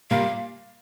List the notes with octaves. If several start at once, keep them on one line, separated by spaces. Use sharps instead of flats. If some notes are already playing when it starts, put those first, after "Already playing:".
A#2 G3 A#3 F5